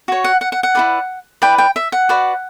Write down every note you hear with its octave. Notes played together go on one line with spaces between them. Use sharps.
F#4 C#5
F#5
F#5
F#5
F#5
E4 G4 B4 D5
E4 B4 D5 G5
G5
E5
F#5
F#4 B4 D5